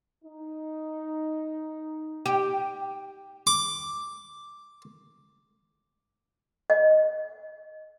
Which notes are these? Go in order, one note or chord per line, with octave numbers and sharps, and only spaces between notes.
D#4
G4
D6
D#5